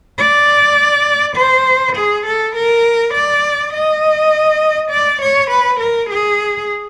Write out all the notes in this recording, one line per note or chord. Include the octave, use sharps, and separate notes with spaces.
D5
C5
G#4
A4
A#4
D5
D#5
D5
C#5
B4
A#4
G#4